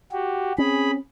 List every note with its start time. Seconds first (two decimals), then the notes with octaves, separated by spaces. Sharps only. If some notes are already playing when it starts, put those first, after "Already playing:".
0.12 F#4 G4
0.58 C4 C#4 G#4 B5